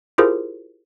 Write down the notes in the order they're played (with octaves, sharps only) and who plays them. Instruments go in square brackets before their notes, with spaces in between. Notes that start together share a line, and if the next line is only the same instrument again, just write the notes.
[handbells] E4 F4 G4 G#4 A#4 C5